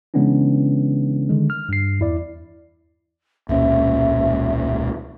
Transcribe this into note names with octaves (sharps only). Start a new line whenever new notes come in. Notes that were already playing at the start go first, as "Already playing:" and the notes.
C#3 E3 G#3 B3 C#4 D4
D3 D#3 G#3
F6
G2 C7
E2 E4 D5
E1 C#2 A#2 C#4 E5